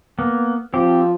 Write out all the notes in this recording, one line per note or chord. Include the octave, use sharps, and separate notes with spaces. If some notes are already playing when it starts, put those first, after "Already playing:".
A#3 B3
F3 C4 G4